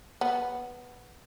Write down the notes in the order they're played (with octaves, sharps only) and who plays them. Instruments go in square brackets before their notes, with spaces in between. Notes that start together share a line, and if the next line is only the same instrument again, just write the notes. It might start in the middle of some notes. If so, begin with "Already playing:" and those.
[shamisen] B3